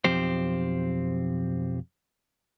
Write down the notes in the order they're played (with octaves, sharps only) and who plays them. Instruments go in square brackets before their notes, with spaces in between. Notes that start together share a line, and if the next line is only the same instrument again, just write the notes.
[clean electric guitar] B1 F2 F3 C4 G4 C5